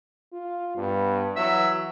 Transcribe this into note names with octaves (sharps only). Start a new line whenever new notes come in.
F4
G2 B3
E3 F#3 E5